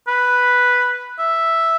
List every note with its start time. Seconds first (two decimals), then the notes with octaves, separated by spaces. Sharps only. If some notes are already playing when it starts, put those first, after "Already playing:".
0.08 B4
1.19 E5